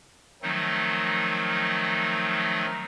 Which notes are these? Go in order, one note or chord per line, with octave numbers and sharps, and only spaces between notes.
D#3 F3 F#3 A3 C4 D#4